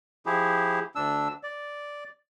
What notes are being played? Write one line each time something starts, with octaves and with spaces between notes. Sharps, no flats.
F3 E4 G4 G#4
D2 D4 E6
D5